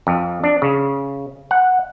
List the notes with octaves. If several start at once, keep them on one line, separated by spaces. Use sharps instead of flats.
F2
D4
C#3
F#5